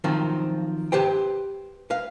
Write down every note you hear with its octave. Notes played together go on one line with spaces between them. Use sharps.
D#3 F3 F#3 C4
G4 B4 C5 G5
B4 F5